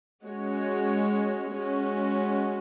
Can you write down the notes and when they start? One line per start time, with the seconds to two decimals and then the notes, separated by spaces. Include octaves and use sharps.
0.24 G#3 C#4 F#4 C#5
1.54 G#3 C#4 F#4